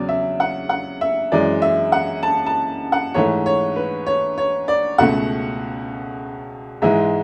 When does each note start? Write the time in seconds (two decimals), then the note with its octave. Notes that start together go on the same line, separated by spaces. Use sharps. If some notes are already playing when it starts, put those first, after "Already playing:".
Already playing: E2 C#3 F#3 D5
0.09 E5
0.40 F#5
0.69 F#5
1.01 E5
1.32 F#2 E3 G#3 D5
1.62 E5
1.92 F#5
2.23 A5
2.46 A5
2.92 F#5
3.14 G#2 E3 A3 C#5
3.46 C#5
3.76 B4
4.06 C#5
4.38 C#5
4.68 D5
4.98 C#2 B2 A3 F#5
6.82 G#2 E3 G#3 E5